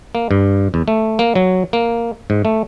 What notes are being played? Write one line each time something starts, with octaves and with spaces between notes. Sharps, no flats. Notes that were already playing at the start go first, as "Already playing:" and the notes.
A#3
G2
E2
A3
A#3
F#3
A#3
G#2
A3